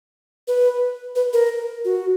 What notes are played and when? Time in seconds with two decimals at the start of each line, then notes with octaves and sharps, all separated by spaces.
0.48 B4
1.16 B4
1.33 A#4
1.85 F#4